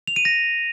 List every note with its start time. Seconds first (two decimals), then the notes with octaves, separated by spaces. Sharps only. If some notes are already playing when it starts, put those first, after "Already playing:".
0.07 F7
0.16 D#7
0.25 A#6